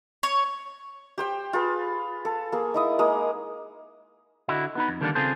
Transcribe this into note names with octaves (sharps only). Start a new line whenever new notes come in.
C#5
G4 C5 G5
F4 G#4 B4
A4
A#3 G#4
D#4 E4 D#6
G#3 A#3 G#4 D#6
D3 E4 F#4 D#5
B3 D#4 B5
F2
D3 D#3 G3 A#3 C#4 D4
C#3 C4 F4 G#4 A4 C5